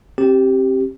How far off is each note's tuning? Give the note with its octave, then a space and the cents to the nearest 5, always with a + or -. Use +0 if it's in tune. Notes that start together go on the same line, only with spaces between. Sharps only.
C4 +25 G4 -10